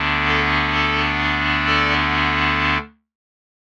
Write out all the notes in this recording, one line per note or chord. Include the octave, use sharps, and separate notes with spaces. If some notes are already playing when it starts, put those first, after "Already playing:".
Already playing: D2 D3 B3 D4
A4
A4
A4 D5